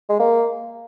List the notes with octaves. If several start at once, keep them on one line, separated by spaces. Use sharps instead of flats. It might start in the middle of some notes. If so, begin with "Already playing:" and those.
G#3
A#3